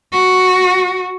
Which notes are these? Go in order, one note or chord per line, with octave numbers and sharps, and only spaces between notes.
F#4